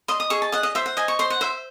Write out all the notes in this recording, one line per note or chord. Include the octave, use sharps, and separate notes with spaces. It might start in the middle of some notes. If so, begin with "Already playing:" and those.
D#5 C6
D#6
G#4 C#6
A5
D#5 F#5
D#5
C5 E5
F#5
D#5 G#5
C#6
C5 C6
F#5
C5 E5